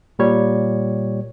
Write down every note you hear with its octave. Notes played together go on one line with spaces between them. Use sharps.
A#2 G3 C#5